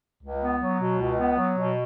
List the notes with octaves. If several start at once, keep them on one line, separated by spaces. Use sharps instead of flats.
C#2
B3
F#3
B2
C#2
B3
F#3
B2